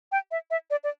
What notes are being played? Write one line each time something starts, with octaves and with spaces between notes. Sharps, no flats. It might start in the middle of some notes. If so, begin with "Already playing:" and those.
G5
E5
E5
D5
D5